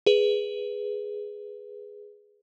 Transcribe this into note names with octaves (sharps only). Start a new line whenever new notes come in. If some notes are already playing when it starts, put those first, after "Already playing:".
G#4 B4